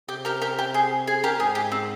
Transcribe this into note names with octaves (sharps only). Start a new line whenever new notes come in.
C3 G4
G4 A#4
G4 A#4
G4
G#4
G#4
G4 A#4
G#2 G#4
G4
C4